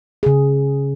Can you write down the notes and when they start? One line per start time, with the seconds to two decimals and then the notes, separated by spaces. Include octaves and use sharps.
0.23 C#3 G#4